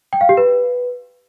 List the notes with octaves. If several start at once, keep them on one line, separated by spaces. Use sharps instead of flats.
G5
F5
G4
B4